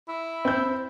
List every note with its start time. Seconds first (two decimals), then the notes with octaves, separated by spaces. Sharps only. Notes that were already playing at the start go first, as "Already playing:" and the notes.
0.08 E4
0.45 C4 G6